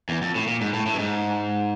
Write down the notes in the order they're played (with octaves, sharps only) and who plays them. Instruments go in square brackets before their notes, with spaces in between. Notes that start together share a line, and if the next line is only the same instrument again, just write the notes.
[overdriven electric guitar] E2
F2
A2
A#2
G#2
A2
A2
G2
G#2